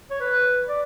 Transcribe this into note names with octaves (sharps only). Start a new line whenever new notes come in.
C#5
B4
D5